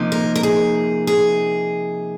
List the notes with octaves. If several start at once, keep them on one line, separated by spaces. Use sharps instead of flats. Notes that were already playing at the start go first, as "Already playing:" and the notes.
Already playing: C3 F3 A#3 D#4
A#4
A#4
G#4
G#4